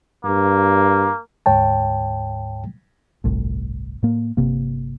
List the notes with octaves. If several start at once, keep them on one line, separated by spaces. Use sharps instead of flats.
G2 A#3
D2 G#2 C#5 G5 A5
G1 C2 A2
A2 A#3
G1 C3 A#3